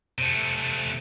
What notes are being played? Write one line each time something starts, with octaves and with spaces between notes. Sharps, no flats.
C3 A3